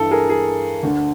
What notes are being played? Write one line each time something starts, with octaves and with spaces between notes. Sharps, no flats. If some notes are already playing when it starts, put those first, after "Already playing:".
Already playing: G2 E3 A4
G#4 A#4
G#4
D2 D3